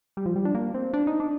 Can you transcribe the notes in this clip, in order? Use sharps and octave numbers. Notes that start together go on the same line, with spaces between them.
G3
F3
G3
D4
A#3
C4
D4
D#4
D4